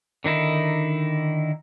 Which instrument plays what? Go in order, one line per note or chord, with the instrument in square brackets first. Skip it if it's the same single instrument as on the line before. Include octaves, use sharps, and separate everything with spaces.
[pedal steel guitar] D3 D#3 D#4 E4